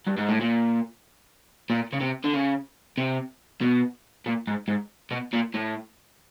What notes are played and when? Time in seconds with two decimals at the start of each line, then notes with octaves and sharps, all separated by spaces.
0.07 G2
0.18 G#2
0.29 A2
0.41 A#2
1.70 A#2
1.93 C#3
2.01 C3
2.24 D3
2.33 C#3
2.98 C3
3.61 B2
4.26 A#2
4.47 G#2
4.68 G#2
5.11 B2
5.33 A#2
5.54 A2